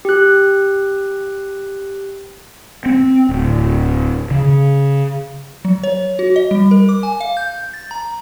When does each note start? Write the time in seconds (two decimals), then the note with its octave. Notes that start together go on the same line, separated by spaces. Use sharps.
0.05 G4 F#6
2.86 C4
3.29 D1
4.31 C#3
5.65 F#3
5.83 C#5
6.19 F#4
6.36 D#5
6.51 G3
6.71 A#4
6.89 D6
7.03 G#5
7.20 F5
7.37 G6
7.74 A6
7.91 A#5